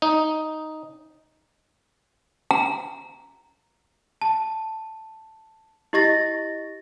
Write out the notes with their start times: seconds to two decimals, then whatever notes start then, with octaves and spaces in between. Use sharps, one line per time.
0.02 D#4
2.51 A#5
4.22 A5
5.93 E4 G4 D#5 C#6 A6 A#6